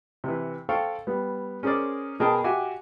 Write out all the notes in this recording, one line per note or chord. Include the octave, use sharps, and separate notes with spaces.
C3 E3
A4 C5 F5 G5 C#6
G3 B3
C#4 G#4 A#4 C5 D5
B2 G#4 A#4 G5 A5
F#4 G4 E5 G#5